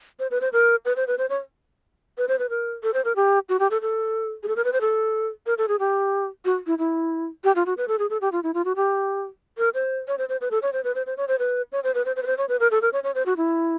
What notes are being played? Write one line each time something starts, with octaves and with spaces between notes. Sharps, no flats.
C5
B4
C5
A#4
B4
C5
B4
C5
C#5
B4
C5
B4
A#4
A4
C5
A#4
G4
F#4
G4
A4
A4
G#4
A4
A#4
B4
C5
A4
A#4
A4
G#4
G4
F#4
E4
E4
G4
F4
F#4
B4
A4
G#4
A4
G4
F4
E4
F4
F#4
G4
A#4
C5
C#5
C5
C5
B4
A4
C#5
C5
B4
C5
C5
C#5
C5
B4
C#5
C5
B4
C5
C5
B4
C5
C#5
B4
A#4
A4
A#4
C#5
C#5
C5
F#4
E4